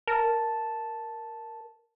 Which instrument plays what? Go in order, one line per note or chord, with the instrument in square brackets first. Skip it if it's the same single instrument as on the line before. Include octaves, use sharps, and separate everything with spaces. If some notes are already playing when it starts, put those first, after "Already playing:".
[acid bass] A#4 [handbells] A5